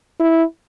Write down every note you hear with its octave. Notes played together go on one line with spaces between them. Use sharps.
E4